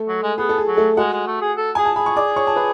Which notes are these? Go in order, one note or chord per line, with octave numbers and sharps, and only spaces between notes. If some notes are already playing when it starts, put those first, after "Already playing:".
Already playing: A3 A4
F#3
G#3
B3 G#4
A4
G#4
F#3
A3 A4
G#3 F#4 F#5
G#3
A3
G#4
A4
G#4 G#5
A5
G#4 B5
C#6
D5 D6
C#5 C#6
A5
B4 B5